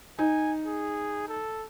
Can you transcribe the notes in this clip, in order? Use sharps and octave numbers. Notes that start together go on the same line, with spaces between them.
D#4 G#5
G#4
A4